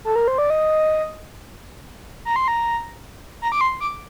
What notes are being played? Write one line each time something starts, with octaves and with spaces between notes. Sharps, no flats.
A4
A#4
C5
D5
D#5
A#5
C6
A#5
A#5
D6
C6
D6